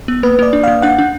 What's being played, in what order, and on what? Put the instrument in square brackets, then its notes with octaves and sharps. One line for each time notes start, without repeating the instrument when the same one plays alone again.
[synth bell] B3
[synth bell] A#3 [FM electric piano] B4
[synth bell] A#3 [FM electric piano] D5
[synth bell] D4
[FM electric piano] F5
[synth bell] A#3
[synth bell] D4 [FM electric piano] F#5
[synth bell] D4